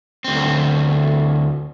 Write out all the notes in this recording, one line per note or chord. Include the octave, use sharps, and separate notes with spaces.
D2 C4